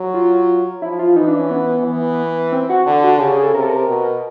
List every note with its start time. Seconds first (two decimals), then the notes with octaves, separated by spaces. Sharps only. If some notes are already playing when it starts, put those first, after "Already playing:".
Already playing: F#3
0.14 F4
0.82 F3 E4
0.99 F4
1.16 E3 D#4
1.28 D4
1.39 C#4
1.51 B3
1.84 E3
2.52 C4
2.70 F#4
2.86 D3
3.03 F#4
3.20 C#3 G4
3.32 G#4
3.43 A4
3.54 C3 A#4
3.62 A4
3.70 A#4
3.88 B2